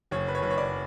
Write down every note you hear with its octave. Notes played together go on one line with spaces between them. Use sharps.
F#1 C#5
B4
C#5
F#1 B4
C#5
D5